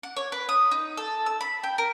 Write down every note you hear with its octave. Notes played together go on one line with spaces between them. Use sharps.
F#5
C#5
B4
D#6
D#4
A4
E6
B5
G5
A#4